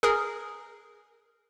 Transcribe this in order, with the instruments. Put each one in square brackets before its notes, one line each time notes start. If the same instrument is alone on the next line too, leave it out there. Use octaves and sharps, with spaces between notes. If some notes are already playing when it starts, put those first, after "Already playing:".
[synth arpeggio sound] G#4 A#4